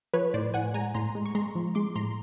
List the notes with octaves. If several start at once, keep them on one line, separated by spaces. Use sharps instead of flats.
F3 B4 C#5
A2 C5 D5
A2 F#5 G#5
G#3 G#5 A#5
A2 A#5 C6
G#3
C#6
G#3 A#5 C6
F3
G#3 C6 D6
A2 A#5 C6